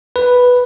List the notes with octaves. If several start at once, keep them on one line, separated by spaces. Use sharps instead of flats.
B4